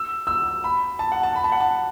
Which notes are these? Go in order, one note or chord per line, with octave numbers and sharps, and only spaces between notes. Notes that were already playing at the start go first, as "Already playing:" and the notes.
Already playing: E6
E6
B5
A5
F#5
A5
B5
A5
F#5
A5